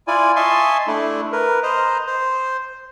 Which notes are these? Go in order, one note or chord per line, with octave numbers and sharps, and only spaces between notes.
E4 F4 D5 G#5
D#5 E5 G#5 A5 C6 C#6
A3 D4 E4
A#4 B4
C5 D#5 A#5
C5